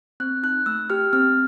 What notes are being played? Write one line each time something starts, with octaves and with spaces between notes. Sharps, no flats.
C4 F#6
D#4 F#6
A3 E6
G4 F6
C4 F6